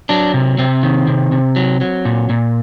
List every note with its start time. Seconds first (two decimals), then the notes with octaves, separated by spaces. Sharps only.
0.09 F#3 D4
0.34 C3
0.58 C3 C4
0.83 D#3
1.07 C3
1.32 C3
1.56 F#3
1.81 F#3
2.05 A#2
2.30 A#2